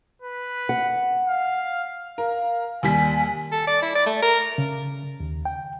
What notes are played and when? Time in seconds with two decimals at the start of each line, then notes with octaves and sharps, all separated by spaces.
0.22 B4
0.69 F#5
1.28 F5
2.18 A#4 F5
2.83 D#2 G3 G#5 B6
3.52 A4
3.67 D5
3.82 E4
3.95 D5
4.06 A3
4.22 A#4
4.58 C#3
5.20 D#2
5.45 G5